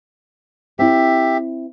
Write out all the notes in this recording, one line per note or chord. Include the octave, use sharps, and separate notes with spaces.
C4 E4 G4 E5